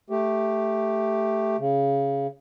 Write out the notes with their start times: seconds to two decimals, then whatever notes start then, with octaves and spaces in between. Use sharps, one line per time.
0.10 A3 G4
1.59 C#3